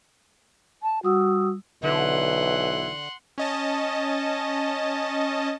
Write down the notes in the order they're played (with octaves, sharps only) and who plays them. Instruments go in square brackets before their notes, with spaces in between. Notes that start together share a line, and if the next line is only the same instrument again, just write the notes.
[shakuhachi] A5
[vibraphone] G3 D#6 E6 [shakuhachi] F#4
[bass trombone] B1 [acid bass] D3 [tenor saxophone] E3 [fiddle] F#5 C6
[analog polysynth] C#4 D#5 A5